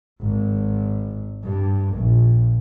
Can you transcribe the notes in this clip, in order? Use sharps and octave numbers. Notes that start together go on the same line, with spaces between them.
G#1
G2
A#1